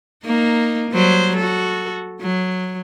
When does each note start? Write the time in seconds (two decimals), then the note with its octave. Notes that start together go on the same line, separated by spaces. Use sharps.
0.24 A#3 D#4
0.91 F#3 G3 C5
1.37 F#4 A4
2.22 F#3